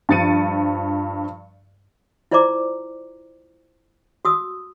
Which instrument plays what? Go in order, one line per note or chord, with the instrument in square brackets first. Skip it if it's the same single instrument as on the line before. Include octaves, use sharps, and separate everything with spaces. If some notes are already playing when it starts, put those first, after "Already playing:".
[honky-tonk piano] G2 F3 A6 C#7 D#7
[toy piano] E4 F4 C5 D5 A#5 D6
F#4 D#6 E6